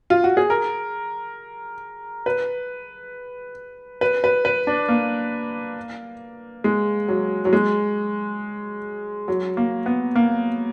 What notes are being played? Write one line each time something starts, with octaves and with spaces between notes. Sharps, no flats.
F4
F#4
G#4
A#4
B4
B4
B4
B4
D4
A#3
G#3
F#3
F#3
G#3
F#3
A#3
B3
A#3